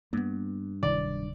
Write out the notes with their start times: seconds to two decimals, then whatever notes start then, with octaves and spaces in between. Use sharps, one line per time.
0.13 G2 A#3 B3
0.83 D1 C3 D#3 D5